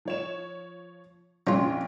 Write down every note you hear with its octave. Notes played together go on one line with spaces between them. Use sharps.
F3 C#5 E7
A#1 F2 C#4 F4